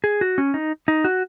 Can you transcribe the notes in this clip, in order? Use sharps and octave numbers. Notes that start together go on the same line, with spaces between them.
G#4
F#4
C#4
D#4
D#4
F#4